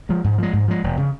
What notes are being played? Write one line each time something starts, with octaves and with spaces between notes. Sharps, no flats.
F3 G#3
G#2
F3 G#3
G#2
F3 G#3
E1
C#3